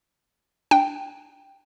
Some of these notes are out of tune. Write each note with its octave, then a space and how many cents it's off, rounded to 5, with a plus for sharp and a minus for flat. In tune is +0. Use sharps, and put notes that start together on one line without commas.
D4 +0 G5 +0